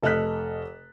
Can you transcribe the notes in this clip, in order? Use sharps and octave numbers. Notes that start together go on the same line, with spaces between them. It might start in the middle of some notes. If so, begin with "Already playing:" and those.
F1 A4 D#5 F6 F#6 B6